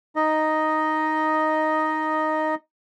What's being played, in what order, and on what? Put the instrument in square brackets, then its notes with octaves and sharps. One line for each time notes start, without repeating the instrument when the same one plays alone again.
[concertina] D#4 D#5